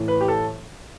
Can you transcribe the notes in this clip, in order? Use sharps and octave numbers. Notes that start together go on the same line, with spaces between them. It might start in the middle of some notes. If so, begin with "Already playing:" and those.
Already playing: A2 E3
B4
G4
A4